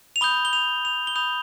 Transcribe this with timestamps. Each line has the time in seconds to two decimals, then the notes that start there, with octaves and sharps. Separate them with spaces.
0.16 F7
0.21 B5 D#6 G6 G7
0.45 G7
0.53 F7
0.85 F7
1.07 G7
1.16 B5 D#6 G6 F7